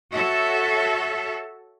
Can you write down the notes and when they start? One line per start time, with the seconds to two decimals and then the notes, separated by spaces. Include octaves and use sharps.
0.12 F#4 A4 C#5 E5